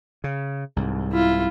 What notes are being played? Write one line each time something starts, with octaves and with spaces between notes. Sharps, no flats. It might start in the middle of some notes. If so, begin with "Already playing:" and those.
C#3
C2 G#2
E4 F4